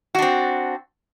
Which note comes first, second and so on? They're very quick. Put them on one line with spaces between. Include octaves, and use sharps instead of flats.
F#4 D4 C4